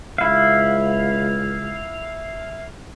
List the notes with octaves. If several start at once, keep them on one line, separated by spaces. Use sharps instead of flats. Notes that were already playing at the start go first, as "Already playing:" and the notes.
C#2 E4 F5